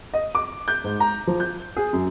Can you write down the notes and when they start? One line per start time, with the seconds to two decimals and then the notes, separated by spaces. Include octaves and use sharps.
0.14 D#5
0.35 D6
0.68 G6
0.84 G#2
1.00 A#5
1.27 F3
1.40 G6
1.77 G#4
1.93 F#2